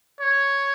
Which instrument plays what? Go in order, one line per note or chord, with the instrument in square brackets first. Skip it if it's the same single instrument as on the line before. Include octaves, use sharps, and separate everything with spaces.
[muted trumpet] C#5